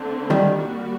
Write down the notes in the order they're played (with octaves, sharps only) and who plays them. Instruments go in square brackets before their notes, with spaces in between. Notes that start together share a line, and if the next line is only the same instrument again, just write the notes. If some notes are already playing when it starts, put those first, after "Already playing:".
Already playing: [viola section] D3 A3 C4
[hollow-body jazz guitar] D#3 G3
[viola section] G3 A#3 F#4